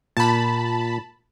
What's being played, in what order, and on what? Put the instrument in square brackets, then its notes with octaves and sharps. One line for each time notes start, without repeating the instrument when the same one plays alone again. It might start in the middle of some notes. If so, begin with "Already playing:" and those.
[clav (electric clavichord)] A#2 [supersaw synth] A5 B5